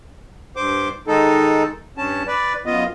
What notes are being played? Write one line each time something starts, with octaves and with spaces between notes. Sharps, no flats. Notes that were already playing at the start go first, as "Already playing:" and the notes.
G2 C5 D6
D#3 G#3 D#4 A4
G2 C#4 A5
B4 D5
F#2 B3 F4 D#5